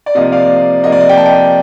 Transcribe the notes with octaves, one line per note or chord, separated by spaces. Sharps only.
D5
C3 F3 A#3 D#5
D5 F5
C3 F3 A#3 D#5
D5
D#5
G5
A5
D#5 G5